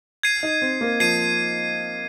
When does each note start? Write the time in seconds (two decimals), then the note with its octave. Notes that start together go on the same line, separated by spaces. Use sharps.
0.23 G#6 C7 D#7
0.43 D#4
0.62 C4
0.81 A#3
1.00 F3 G#6 C7 D#7